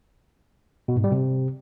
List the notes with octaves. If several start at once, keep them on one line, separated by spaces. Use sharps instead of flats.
B2
G#2
G3
C3